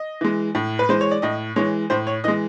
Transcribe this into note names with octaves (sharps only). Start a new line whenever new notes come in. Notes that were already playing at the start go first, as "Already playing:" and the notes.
Already playing: D#5
E3 G#3
A2
B4
E3 G#3 C5
C#5
D5
A2 D#5
E3 G#3 C#5
A2 C5
C#5
E3 G#3 D#5